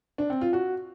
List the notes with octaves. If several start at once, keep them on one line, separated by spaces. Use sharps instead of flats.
D4
C4
F4
F#4